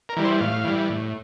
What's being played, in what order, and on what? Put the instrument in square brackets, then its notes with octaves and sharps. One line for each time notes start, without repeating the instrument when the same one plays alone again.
[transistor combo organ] A#4
E3 G3
C5
A2 F5
E3 G3
A2